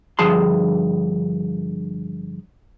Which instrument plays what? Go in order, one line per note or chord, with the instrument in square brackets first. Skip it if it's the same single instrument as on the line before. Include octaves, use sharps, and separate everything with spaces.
[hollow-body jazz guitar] G2 D3 F3 G#4 A5 C6